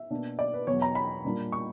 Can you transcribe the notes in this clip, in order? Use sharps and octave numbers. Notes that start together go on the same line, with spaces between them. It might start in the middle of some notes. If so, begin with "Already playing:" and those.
Already playing: E5
B2 A#3 D4
D5
B4
E2 B2 F#3 C#5
A#5
B5
A#2 G3 A#3 D4
C#6